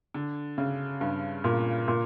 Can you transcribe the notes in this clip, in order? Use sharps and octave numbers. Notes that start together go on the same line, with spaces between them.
D3
C#3
G2
A#2
A#2